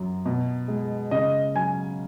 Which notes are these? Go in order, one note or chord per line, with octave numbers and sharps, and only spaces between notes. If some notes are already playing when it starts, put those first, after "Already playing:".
Already playing: F#2 F#3
B2
G#3
C#3 D#5
F#3 G#5